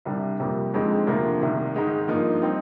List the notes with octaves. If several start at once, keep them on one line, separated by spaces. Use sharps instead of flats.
C2 C3 G3 D4
F2 C3 G3 A#3
F2 D3 G#3 C4 D#4
D2 C3 F3 A#3 D4
C2 C3 D#3
G#2 D#3 G#3 D#4
G2 F3 A#3 D#4
G3 C4 D#4